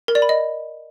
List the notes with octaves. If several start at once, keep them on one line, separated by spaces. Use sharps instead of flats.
A#4
D5
B5
D#5